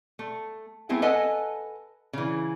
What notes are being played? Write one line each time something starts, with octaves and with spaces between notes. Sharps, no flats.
A3
F#3 A3 B3 C4 E4 G#4
A4 B4 D#5 F#5 G#5 A5
C#3 E3